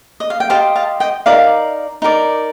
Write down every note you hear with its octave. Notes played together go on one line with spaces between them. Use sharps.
D#5
F5
G5
G4 C5 D#5 F5 A5
F5 A5
D#5 G5
D#4 A#4 D5 F5
D#4 A#4 D5